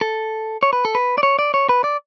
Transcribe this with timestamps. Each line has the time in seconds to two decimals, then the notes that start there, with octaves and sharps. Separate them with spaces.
0.01 A4
0.63 C#5
0.73 B4
0.85 A4
0.95 B4
1.18 D5
1.23 C#5
1.39 D5
1.54 C#5
1.69 B4
1.84 D5